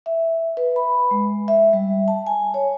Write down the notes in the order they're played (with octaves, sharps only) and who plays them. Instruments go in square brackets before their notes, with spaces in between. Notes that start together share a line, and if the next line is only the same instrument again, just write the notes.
[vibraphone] E5
B4
B5
G#3
E5
G3
A5
G#5
C#5